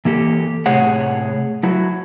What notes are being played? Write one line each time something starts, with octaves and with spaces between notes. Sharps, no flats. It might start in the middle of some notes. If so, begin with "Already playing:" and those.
E3 A#3 G4 A4
A2 C3 A3 G#4 C#5 F#5
F#3 E4 F#4